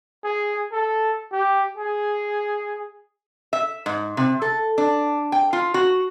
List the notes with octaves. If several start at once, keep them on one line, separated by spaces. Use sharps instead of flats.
G#4
A4
G4
G#4
E5
G#2
C3
A4
D4
G5
F4
F#4